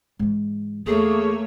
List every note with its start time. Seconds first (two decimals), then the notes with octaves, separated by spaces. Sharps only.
0.19 G#2 E3
0.86 E2 A3 A#3 G#4 C#5